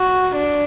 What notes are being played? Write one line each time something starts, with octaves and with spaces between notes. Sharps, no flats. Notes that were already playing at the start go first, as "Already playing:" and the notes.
Already playing: F#4
D4